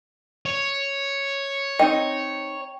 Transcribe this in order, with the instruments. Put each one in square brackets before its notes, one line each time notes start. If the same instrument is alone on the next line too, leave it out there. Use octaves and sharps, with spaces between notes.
[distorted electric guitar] C#5
[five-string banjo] C4 D#4 D#5 [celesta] G5